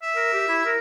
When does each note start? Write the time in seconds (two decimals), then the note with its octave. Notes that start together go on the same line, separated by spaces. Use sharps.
0.02 E5
0.16 A#4
0.33 G4
0.48 E4
0.65 A#4